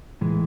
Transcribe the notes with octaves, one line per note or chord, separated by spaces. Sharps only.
A2 E3 G#3